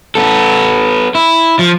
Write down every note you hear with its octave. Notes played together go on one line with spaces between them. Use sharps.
B3 A4
E4
F3